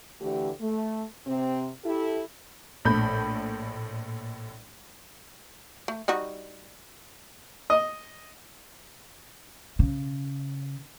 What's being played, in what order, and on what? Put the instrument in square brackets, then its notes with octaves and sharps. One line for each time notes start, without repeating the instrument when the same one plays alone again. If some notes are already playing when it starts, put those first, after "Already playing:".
[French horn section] D2 D3 E3 A3 G4
A3
C3 C4
E4 G4 A4
[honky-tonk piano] A#1 A2 B5 G6
[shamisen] A3
G3 D#4 F#4
[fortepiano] D#5
[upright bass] C#3